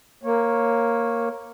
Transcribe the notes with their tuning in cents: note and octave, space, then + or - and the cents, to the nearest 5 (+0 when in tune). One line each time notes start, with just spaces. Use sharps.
A#3 +0 C#5 -15